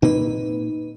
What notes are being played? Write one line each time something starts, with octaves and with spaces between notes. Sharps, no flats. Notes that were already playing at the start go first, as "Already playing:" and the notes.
A#2 A#3 C4 D#4 B4